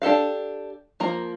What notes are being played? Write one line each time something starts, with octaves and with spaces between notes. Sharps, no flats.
D4 G4 A4 F5
F3 A#3 A#5